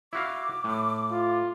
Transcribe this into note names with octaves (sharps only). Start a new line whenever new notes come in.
E4 F#4 F5 D6
A2
F4